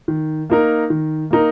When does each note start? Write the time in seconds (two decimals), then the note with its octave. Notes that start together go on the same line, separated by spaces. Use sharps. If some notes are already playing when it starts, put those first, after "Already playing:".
0.08 D#3
0.50 A#3 D#4 A#4
0.90 D#3
1.31 A#3 D#4 A#4